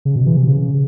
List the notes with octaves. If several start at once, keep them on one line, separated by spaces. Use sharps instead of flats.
C#3
B2
E3
C3
C#3